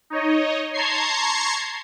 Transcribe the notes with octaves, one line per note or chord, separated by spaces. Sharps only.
D#4 C#5 D#5
A5 A#5 C6 C#6 G#6 C7